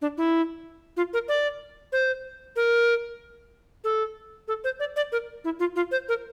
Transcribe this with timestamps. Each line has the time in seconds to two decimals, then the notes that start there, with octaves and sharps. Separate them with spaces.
0.02 D4
0.17 E4
0.97 F4
1.13 A#4
1.28 D5
1.92 C5
2.56 A#4
3.84 A4
4.48 A4
4.64 C5
4.80 D5
4.96 D5
5.12 A#4
5.44 E4
5.59 F4
5.76 F4
5.91 C5
6.09 A#4